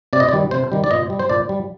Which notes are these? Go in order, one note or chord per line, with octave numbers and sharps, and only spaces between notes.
C3 D5
D#5
D5
D#3 G3
C3 C5
D#3 G3
D5
A#2 D#5
G3
C5
A#2 D5
G3